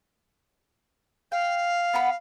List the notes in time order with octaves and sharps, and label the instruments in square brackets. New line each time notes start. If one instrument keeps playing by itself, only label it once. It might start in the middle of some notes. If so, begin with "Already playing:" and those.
[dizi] F5 [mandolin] G5
[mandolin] B3 F#5 B5